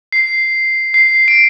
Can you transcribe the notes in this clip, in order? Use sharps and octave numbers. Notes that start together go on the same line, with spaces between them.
C7
C7
D7